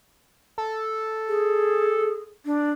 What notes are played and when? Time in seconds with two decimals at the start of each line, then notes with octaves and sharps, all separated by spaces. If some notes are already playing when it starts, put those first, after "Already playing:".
0.58 A4
1.28 G#4
2.46 D4